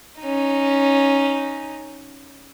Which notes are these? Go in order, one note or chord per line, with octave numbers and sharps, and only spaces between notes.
C#4 D#4